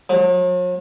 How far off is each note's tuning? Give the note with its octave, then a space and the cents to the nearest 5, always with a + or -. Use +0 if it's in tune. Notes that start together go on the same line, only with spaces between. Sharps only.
F#3 -45